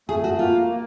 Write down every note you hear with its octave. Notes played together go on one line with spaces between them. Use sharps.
A3 G#4
F#4
A#3 F4
A#3